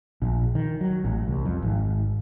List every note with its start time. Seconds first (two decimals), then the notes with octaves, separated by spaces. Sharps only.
0.22 A#1
0.55 D#3
0.81 F#3
1.04 A1
1.28 C2
1.45 F2
1.62 G#1